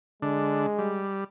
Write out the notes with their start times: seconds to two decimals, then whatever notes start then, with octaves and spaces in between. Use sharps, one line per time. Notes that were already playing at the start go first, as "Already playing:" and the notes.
0.22 D3 G#3 D4
0.79 G3